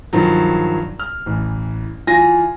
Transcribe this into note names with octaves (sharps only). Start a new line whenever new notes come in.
G2 D#3 F3 F#3
F6
A1 E3
E3 F4 G#5 A#6